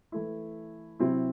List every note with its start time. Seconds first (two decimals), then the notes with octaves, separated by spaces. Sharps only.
0.12 E3 A3 E4
1.00 C3 F#3 C4 E4